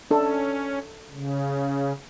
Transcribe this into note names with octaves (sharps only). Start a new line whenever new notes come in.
C#4 D4 A4
C#3